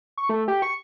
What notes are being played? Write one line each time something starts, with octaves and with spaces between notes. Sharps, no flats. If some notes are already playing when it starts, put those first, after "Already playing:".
C#6
A3
G4
C#6